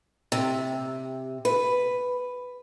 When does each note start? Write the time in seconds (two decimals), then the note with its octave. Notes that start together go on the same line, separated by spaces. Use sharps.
0.32 C3
1.45 B4